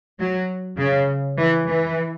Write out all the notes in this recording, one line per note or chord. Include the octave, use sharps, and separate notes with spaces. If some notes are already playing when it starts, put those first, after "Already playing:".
F#3
C#3
E3
E3